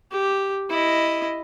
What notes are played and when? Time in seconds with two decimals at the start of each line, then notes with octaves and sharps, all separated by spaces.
0.12 G4
0.70 E4 D#5